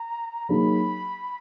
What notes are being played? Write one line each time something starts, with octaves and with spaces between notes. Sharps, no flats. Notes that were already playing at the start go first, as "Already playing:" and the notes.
Already playing: A#5
F#3 A#3 D#4 G#4 B5